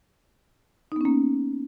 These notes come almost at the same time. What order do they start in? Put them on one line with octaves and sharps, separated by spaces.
D#4 B3 C#4 A#3